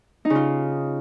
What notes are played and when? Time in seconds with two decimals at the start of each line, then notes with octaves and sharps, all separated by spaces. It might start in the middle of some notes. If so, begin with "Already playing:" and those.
0.25 D#4
0.30 C#3
0.35 F4